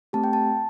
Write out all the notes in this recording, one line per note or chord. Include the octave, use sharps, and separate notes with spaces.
A3 C4 G4 A5
G5
A5